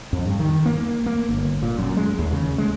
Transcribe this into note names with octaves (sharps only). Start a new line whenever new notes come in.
F2
G2
D#3
A#3
A#3
G1
A#2
F#2
G#3
D#2
C#3
G#3